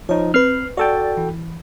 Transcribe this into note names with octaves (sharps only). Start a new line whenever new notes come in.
F3 D#4 C#5
C4 B4 F6 C7
F#4 A4 D5 G5 A6
E3